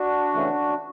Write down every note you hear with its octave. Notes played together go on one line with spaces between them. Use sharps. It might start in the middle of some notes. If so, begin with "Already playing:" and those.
Already playing: D4 F#4
C#3 E3 A3